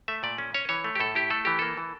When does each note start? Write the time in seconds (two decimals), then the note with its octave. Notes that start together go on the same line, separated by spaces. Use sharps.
0.08 A3 E5
0.23 A#2 D5
0.38 C#4
0.54 C#4 C#5
0.69 E3 C#5
0.84 A3
0.95 G4
1.00 A2 A4
1.15 E4 G4
1.30 A3 A4
1.45 E3 G4
1.59 A#3 A4
1.77 E3